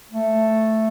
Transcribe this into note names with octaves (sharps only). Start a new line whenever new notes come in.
A3